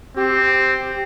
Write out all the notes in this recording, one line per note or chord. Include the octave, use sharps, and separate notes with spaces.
C4 G4